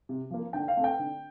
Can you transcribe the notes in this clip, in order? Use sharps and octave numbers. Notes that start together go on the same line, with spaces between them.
C3
F3 A#3
D3 G5
F5
A3 C4
G5
D3